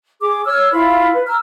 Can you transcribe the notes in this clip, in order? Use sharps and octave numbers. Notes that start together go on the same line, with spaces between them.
G#4 D6
C#5 E6 F6
E4 F4 F5 B5
B4
A#5 E6 F6